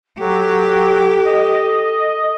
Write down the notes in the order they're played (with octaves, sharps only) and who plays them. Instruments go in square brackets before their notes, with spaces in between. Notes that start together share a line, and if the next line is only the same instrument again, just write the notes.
[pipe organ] F#3 [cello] G4 [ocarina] A4
[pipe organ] D#5